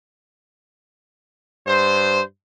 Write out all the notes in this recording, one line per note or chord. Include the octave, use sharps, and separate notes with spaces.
G2 C5